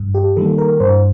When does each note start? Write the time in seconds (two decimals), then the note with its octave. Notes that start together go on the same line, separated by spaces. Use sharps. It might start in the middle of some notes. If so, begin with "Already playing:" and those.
Already playing: G2
0.15 G4
0.36 D#3 G3 A#3 A4
0.58 A#4
0.80 G2 C5